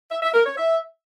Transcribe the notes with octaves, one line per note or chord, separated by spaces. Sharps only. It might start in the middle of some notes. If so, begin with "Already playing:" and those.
E5
E5
A#4
C#5
E5